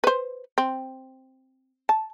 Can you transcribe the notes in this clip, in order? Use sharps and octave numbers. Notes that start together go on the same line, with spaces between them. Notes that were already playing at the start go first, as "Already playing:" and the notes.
B4 C5
C4
A5